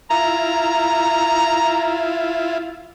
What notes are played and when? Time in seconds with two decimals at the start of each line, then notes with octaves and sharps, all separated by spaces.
0.10 E4 F4 A#5